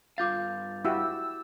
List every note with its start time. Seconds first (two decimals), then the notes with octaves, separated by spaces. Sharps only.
0.18 G2 F4 F5 D6 G6 A6
0.85 E4 F#4 G4 E6